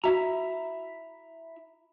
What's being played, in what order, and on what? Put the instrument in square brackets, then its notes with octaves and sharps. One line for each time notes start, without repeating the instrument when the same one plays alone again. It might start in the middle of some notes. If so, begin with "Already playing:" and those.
[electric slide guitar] E4 E5 A#5 [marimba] F#4